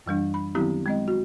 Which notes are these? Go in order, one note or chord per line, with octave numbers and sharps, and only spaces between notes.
F#2 E3 G3 D4
B5
D#3 F#3 B3 C4 E4 G4
G#3 C4 D#5
F#4